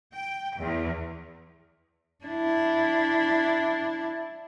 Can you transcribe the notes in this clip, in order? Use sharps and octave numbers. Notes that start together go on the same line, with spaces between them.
G5
E2
D4 E4